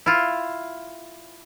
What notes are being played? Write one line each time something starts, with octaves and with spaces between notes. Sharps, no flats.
E4 F4